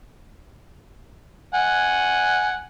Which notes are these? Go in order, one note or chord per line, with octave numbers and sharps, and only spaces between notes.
F#5 G#5